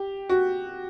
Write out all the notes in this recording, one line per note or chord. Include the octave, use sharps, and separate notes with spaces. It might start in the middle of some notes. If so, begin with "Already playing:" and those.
Already playing: G4
F#4